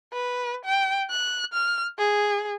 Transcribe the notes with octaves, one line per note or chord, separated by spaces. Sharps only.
B4
G5
F#6
F6
G#4